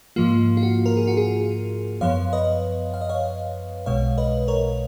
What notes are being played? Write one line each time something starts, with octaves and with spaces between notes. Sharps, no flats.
G#2 F3 A#3 F4
F4
F#4
A#4
G#4
F#4
F4 G#4
F#2 F3 B3 C#5 F5
B4 D#5
F5
D#5
C#5 F5
B1 B2 G#3 C#5 F5
B4 D#5
A#4 C#5